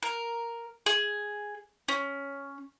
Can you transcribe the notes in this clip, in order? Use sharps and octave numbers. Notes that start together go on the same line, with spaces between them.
A#4
G#4
C#4